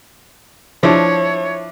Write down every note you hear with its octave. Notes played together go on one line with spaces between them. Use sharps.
F3 D4 E4 C#5